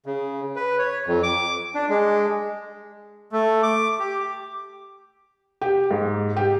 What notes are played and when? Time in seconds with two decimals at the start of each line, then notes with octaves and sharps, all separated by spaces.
0.06 C#3
0.56 B4
0.79 C#5
1.06 F2
1.23 D6
1.74 D4
1.89 G#3
3.32 A3
3.63 D6
3.99 G4
5.61 G4
5.91 G#2
6.37 G4